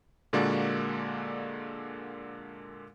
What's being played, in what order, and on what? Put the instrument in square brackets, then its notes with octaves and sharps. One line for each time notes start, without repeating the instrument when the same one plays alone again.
[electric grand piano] A#2 D3 G#3 A#3 F#4 D5